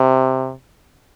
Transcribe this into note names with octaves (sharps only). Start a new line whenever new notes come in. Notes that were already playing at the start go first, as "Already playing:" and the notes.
Already playing: C3